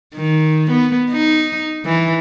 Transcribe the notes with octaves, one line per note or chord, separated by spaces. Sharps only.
D#3
B3
D#4
E3